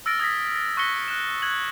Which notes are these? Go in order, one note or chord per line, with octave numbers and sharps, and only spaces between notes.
E6 F6 A6 A#6 D7
D#6 G#6 A#6 B6
A6
C#6 F#6 A#6 B6 C#7 G7
F#6 E7
F#6 G#6 F#7